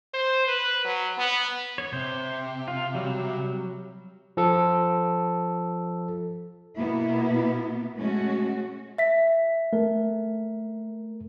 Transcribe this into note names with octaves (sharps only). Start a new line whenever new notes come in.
C5
B4
F#3
B3
C#5
C3 C5
F4
F#3 G3
F3 A4
B2 A#3 B3 E4
G#3 A3 C#4 F#4
E5 B6
A3 A#4